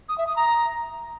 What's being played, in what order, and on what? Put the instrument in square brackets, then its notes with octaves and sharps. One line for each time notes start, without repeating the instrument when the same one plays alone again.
[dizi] D#6
E5
D#6
A#5